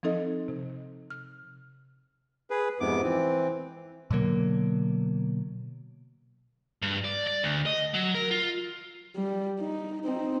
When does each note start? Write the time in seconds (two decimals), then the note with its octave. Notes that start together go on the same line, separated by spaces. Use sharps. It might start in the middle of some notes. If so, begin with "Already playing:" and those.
0.03 F3 C4 D#4 A4 D#5
0.48 C3
1.10 F6
2.50 G#4 B4
2.80 F2 G#2 C3 B3 D6
3.03 E3 C4
4.11 B2 D3 F#3 A#3
6.82 G2
7.04 D5
7.27 D5
7.43 D2
7.66 D#5
7.94 F#3
8.15 A#4
8.31 F4
9.16 G3
9.60 D#4
10.04 C4 D#4